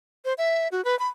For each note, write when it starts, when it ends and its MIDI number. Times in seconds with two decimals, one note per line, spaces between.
0.25 0.34 72
0.38 0.68 76
0.72 0.84 66
0.85 0.98 71
0.99 1.08 83